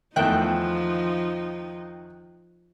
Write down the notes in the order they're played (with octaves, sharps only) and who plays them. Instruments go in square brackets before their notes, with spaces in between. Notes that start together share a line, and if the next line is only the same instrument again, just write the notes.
[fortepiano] E2 A3 E5 [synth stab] D#3 G5 F#6 [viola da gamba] F3 D#4